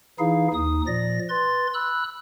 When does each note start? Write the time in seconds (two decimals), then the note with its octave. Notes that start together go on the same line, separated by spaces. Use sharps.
0.19 E3 D#4 E4 G#4 F5
0.54 D#2 D#4 D#6
0.87 A#2 F3 D5 A#6
1.29 B4 C6 A6
1.74 B5 E6 F#6